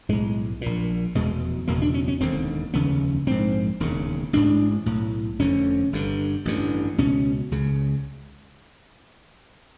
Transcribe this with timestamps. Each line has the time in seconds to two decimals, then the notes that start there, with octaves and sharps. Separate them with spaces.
0.09 B1 A2 G#3
0.61 A#1 A#2
1.15 F1 E2 B2 G#3
1.68 F#1 E2 B2 A#3
1.82 D4
1.94 C#4
2.08 C#4
2.20 E1 D#2 D3 C4
2.74 F1 D#2 C#3 B3
3.27 A#1 G#2 C4
3.80 E1 D#2 C#3
4.33 A1 G#2 D4
4.86 B1 A2
5.39 F1 F2 D3 C#4
5.93 G1 G2 D3
6.45 A1 G2 D3
6.98 C#2 B2 C#4
7.52 C#2 C#3